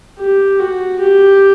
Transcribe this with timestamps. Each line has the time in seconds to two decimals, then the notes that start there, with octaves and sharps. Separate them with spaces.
0.19 G4
0.59 F#4
1.00 G4